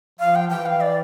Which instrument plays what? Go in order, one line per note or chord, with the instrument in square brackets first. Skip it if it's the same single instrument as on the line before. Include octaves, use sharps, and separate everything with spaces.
[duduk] F3 [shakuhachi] F5
[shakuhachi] G5
[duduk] E3 [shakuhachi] G5
[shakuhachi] F5
D5